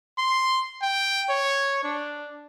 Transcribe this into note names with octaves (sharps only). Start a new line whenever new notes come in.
C6
G5
C#5
D4